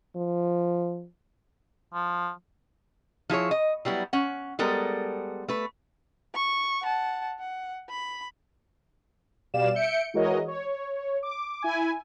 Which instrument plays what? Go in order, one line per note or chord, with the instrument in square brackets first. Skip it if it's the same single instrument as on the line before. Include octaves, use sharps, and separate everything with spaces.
[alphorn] F3
[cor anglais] F3
[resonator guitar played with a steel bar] F3 E4 G#4 C#5
D#5
F#3 G3 B3 E4
C#4 F#5
G3 G#3 B3 A4 A#4
A3 B4
[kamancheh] C#6
F#5 A5
F#5
B5
[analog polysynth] B2 G3 D5 F5 E7
E5 G6 C#7 D7
E3 G#3 F#4 A#4 C#5 D#5
C#5
D6
E4 G#5